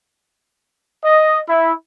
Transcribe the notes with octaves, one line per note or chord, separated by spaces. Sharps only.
D#5
E4